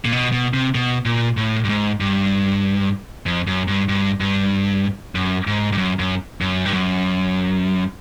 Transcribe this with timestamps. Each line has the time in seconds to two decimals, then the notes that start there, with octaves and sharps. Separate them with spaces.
0.05 A#2
0.12 B2
0.32 B2
0.54 C3
0.75 B2
1.05 A#2
1.37 A2
1.64 G2
1.69 G#2
2.00 G2
3.26 F2
3.47 F#2
3.68 G2
3.89 G2
4.20 G2
5.15 F#2
5.47 G#2
5.72 G2
5.78 F#2
5.99 F#2
6.41 F#2
6.65 G2
6.73 F#2